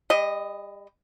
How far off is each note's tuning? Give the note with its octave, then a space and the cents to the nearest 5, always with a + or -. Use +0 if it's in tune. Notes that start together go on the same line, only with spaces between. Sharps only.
G3 +35 D#5 +0